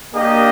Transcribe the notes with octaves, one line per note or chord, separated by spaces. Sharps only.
A#3 D4 G4 D#5